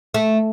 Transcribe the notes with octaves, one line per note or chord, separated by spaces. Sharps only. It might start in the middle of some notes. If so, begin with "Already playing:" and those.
A3